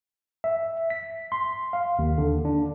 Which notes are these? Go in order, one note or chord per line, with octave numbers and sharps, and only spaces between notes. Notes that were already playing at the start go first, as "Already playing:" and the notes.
E5
B6
C6
F5
D#2
D3
D4